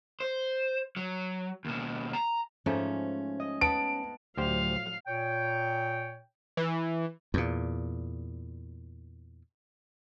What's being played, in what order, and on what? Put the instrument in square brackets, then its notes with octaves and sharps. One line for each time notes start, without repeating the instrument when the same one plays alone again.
[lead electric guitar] C5
F#3
D#2 B2
A#5
[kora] G#2 F3 A3 [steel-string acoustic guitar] C#4
[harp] D#5
[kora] B3 [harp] A5 [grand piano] D7
[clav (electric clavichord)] D2 G4 C5 [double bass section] A2 F3 F#3 [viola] F5
[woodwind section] A#2 C#5 G5
[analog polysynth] E3
[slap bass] E2 A#2